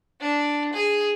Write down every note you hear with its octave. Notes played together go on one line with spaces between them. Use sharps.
D4
G#4